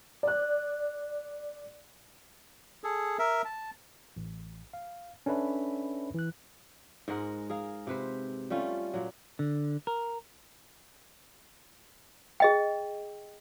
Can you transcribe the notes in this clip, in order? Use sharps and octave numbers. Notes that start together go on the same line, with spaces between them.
D5 F#6
G#4 A4
A#4 E5
A5
A1
F5
C#4 D4 A4 B4 E5 B5
E3 F#6
G#2 G#3 A#4 F#5
G#4 A#4 F5
C3 B4 C5
G3 A3 C#4 F4
A#2 F#3
D3
A#4
G#4 D#5 G5